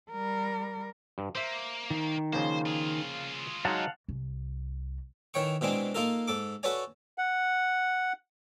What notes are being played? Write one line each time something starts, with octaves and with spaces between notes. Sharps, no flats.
G3 A#4
G2
A#3 C5 E5
D#3
C#3 F3 A#3 C5
F4 G#4
F#3 G#3 D#4 F5 F#5 A5
C2
D#3 E3 C#5 G5 C#6
B2 E3 G#3 C4 D4
A#3 D#4 F4 A4 A#4
G#2 A4 D6
F#4 A4 B4 C#5 D5 G#5
F#5